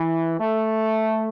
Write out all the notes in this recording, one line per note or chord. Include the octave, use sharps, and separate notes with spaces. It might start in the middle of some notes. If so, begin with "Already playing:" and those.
Already playing: E3
A3